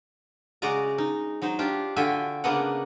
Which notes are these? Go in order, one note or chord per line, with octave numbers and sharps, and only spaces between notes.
C#3 G#3 F#4 D5 D#5 A#5
D#4
F#3 D#4 C5
D4 F4 G4
D3 F4 F#4 E5 G5 G#5
C#3 A#3 B3 D4 D#5 F#5